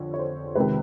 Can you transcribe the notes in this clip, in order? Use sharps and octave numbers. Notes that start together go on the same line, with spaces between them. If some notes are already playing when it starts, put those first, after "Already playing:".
Already playing: F2 D3 C#5
C#5
C5
C#2 C3 D#3 B4